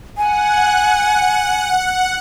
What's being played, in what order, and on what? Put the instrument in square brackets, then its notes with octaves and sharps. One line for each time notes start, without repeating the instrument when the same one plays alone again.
[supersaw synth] F#5 [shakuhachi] G#5